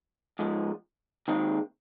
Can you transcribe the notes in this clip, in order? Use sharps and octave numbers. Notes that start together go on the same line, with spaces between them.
G#2 F3 G#3
D#2 D#3 G#3 C4